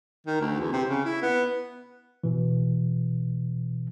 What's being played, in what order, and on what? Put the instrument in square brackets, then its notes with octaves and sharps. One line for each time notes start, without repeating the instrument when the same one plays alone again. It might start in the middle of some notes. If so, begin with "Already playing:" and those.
[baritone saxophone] D#3
D2
E2
C3
C#3
E4
B3
[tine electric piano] B2 E3